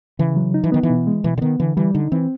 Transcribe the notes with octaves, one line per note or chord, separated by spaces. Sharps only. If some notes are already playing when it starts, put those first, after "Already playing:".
C#3 E3
F#3
D#4
E3
D#3 B3
E3
B2
G#3
B2 E3
D3
D#3 B3
D3 E3
E3 G3
D3 D#4
E3 C4